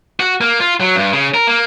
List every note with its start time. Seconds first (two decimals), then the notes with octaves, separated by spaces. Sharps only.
0.20 F#4
0.41 A#3
0.60 F4
0.80 F#3
0.96 G2
1.13 C#3
1.34 A#4
1.47 A#3